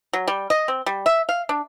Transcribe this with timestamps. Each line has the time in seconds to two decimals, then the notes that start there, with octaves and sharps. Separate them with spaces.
0.13 F#3
0.28 G3
0.50 D#5
0.68 C4
0.86 G3
1.06 E5
1.29 F5
1.49 D4